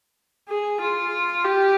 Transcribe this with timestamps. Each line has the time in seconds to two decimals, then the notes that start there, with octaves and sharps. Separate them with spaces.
0.49 G#4
0.81 F4
1.44 G4